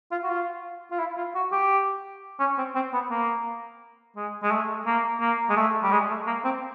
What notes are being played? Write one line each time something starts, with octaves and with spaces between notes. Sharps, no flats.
F4
F#4
F4
F4
E4
F4
F#4
G4
C#4
C4
C4
B3
A#3
G#3
G#3
A3
A#3
A#3
G#3
A3
G3
G#3
A3
A#3
C4